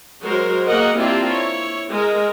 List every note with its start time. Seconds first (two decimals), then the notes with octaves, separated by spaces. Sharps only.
0.23 F#3 G#3 F#4 A#4 C5
0.68 A#3 F#4 G#4 A#4 D#5 F#5
0.99 A#3 C4 D4 E4 F4 G4
1.30 E4 C#5
1.91 G#3 A#4